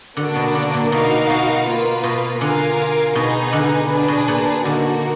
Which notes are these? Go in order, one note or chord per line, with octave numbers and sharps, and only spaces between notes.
D3 A#3 D4 F#4 D5
B2
D3
A#2
B2 D#4 F#4 A#4 F5
B2
A#3 F4 B4
B2
D3 F4 A#4 F5 G#5
B2 B3 D#4 G#4
D3
D4 G#4 B4
B2
A#2
D3 A#3 D#4 F#4